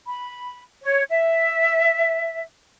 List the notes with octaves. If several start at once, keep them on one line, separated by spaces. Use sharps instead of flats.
B5
C#5
E5